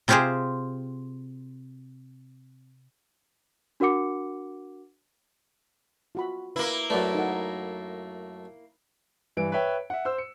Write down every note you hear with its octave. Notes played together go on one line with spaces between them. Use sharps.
C3 C4 F4 G4 G#4 C5
D4 F#4 A#4 F#5 D6 C#7
F4 F#4 B5
A#3 E4 B4
F#2 A3 B4 D5
D#4 A4 F#5
G2 E3 D7
B4 C#5 E5 G5
E5 F#5
C5 E6
C#7